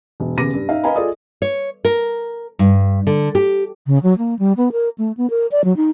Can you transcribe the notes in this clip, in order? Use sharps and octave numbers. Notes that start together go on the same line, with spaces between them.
E1
D#2 C#3 B3 D6 A#6 D#7
G2
D#4 E5 F5
B4 D#5 F5 G#5 A#5 B5
F4 G#4 A4 D5 D#5 D#6
C#5
A#4
G2
D3
G4
C#3
F#3
A#3
G3
B3
A#4
A3
B3
A#4
D5
F#3
D#4